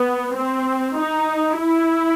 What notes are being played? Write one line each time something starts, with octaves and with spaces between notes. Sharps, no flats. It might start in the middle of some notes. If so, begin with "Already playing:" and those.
Already playing: B3
C4
D#4
E4